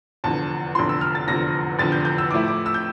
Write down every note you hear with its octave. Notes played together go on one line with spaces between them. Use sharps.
F1 E2 D3 F3 A5
F1 E2 D3 F3 C6
E6
F6
A6
F1 E2 D3 F3 A#6
F1 E2 D3 F3 A6
G6
G6
E6
A2 F3 A3 E4 D6
D6
E6
G6